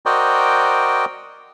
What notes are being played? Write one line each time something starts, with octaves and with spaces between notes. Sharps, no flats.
F#4 A#4 C5 D5 D#5 G5